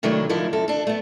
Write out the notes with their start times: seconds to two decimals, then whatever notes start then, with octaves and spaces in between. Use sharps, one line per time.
0.03 C3 D#3 F#3 A3 D4 E4
0.29 D3 F3 D#4 E4 A#4
0.53 F#2 A4
0.68 D4 A4
0.87 A3 B3